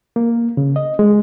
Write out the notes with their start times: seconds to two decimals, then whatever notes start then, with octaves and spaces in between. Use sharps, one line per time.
0.16 A#3
0.57 C#3
0.76 D#5
0.99 G#3